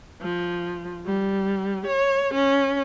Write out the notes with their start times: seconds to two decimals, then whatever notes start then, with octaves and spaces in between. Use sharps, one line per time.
0.22 F3
1.06 G3
1.86 C#5
2.34 C#4